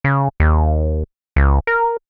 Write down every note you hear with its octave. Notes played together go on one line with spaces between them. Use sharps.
C#3
D#2
C#2
A#4